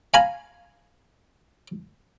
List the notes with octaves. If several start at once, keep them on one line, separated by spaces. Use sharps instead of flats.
F5 G#5 A#5 B5